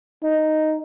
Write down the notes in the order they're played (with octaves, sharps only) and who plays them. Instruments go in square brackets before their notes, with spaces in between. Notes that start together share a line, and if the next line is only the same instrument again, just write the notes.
[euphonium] D#4